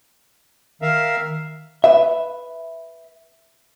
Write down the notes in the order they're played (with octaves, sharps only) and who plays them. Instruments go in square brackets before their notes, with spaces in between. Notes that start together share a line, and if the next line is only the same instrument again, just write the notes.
[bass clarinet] D#3 [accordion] A#4 E5 F5
[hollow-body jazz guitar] B4 E5